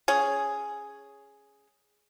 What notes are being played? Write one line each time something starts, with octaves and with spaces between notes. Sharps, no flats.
C#4 G#4